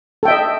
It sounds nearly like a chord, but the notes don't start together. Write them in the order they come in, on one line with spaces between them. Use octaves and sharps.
A4 G5 E5 D#5